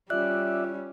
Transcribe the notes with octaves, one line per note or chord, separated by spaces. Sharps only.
G3 C#4 F4 D5 E5 F#6